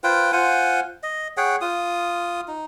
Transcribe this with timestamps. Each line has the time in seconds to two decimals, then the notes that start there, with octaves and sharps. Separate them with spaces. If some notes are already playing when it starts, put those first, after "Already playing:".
0.04 F4 B4 C5 G5
0.32 F4 C5 F#5 G#5
1.03 D#5
1.37 G#4 C#5 F#5 G5
1.61 F4 D#6
2.48 D#4